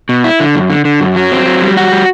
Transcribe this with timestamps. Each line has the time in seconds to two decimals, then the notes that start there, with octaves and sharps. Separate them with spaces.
0.09 B2
0.24 E4
0.40 D3
0.55 F#2
0.70 D3
0.85 D3
1.00 F#2
1.16 F#3
1.32 C4
1.46 F#3
1.62 G3
1.77 F#4
1.92 G3